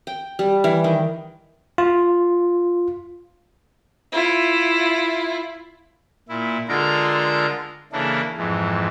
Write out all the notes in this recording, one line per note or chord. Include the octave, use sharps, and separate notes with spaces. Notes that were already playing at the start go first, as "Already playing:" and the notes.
G5
G3
E3
D#3
F4
E4 F4
A#2 E4
D3 G#3 F4 A4 A#4 A#5
C#3 E3 A#3 D4 E4 A4
F2 G#2 E3